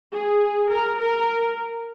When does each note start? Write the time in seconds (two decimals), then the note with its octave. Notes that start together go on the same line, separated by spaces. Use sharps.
0.13 G#4
0.71 A#4
1.00 A#4